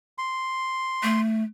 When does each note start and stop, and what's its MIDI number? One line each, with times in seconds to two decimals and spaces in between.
0.18 1.21 84
1.03 1.43 57